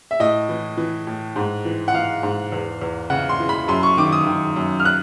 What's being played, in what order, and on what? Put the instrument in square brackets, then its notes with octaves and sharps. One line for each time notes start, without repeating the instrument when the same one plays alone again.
[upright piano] E5
A2 D#5
E3
E3
A2
G#2
E3
F#5
E3 F5
G#2
E2
E2
C#3 F#5
C6
E3
B5
F#2 C6
C#6
D#3 D6
D#6
D#3
F#2
F6
F#6